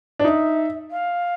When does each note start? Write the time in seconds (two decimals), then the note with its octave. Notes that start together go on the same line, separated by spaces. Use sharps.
0.19 D4
0.24 D#4 E5
0.91 F5